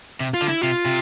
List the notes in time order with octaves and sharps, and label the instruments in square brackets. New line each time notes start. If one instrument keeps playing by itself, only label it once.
[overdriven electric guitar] C3
[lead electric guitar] F4
[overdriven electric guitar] D3
[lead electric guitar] E4
[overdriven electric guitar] C3 [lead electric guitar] F4
[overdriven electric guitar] C3